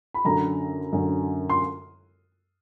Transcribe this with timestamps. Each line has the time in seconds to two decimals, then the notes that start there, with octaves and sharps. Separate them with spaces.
0.14 B5
0.25 F#2 D3 F#3 A#5
0.93 F#2 D3 F#3
1.50 C6